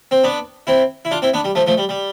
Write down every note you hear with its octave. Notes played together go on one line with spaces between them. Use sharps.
C4
B3 D4
C4 E4
E4
D4 F4
C4 E4
B3 D4
G3
F3 A3
F3 A3
G3
G3